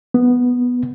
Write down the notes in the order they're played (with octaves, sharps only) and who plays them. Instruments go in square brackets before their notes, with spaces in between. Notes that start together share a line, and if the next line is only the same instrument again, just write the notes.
[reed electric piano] B3